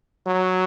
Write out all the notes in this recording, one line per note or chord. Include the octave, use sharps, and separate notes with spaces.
F#3